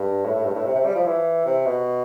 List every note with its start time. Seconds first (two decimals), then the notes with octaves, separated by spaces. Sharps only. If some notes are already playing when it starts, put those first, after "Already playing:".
Already playing: G2
0.25 A2
0.35 A2
0.45 G2
0.55 A2
0.65 C3
0.76 C3
0.86 G3
0.96 F3
1.06 E3
1.46 C3
1.66 B2